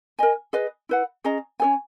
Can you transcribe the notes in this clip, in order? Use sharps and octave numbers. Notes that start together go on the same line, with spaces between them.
A#4 D#5 G#5
G#4 B4 D#5
E4 B4 F#5
C#4 G#4 D#5 A#5
C#4 G#4 C#5 G#5